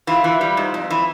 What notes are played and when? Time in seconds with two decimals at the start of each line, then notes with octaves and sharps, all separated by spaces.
0.07 E3 F4
0.24 E3
0.41 G3
0.57 G#2
0.74 F2
0.90 E3